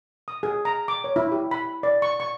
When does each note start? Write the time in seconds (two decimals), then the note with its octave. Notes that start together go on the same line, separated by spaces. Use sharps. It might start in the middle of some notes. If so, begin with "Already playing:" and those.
0.28 D#6
0.43 G#4
0.65 A#5
0.88 D6
1.04 C#5
1.16 E4
1.32 G4
1.51 B5
1.83 D5
2.02 C#6
2.20 C#6